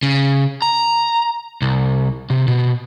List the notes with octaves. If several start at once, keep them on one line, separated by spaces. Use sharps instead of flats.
C#3
A#5
C2
C3
B2